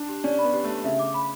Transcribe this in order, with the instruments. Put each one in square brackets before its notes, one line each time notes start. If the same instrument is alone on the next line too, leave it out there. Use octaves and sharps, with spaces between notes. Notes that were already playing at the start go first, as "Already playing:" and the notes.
Already playing: [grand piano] D4
[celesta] G4
[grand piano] C#4 [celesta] D5
[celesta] B5
[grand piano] B3
[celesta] G4
[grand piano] A3
[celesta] G4
[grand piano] C#3 [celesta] E5
[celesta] D6
B5